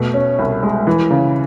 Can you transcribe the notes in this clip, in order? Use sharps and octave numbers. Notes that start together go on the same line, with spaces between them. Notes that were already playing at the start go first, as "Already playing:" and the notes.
Already playing: B2 A3
C#4
C2
G#3
E3
C#3